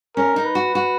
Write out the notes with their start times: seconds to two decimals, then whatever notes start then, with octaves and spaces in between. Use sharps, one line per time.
0.16 C#4 A#4
0.36 D#4
0.45 B4
0.55 F#4
0.75 F#4